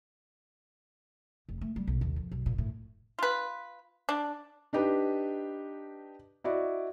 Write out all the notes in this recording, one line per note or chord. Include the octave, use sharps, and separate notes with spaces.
F1
A3
G3
B1
D#2
F2
B1
A#2
A2
F4 B4
D4
D4 D#4 G4 B4
E4 F#4 D5 D#5